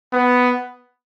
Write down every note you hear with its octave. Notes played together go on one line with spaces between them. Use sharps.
B3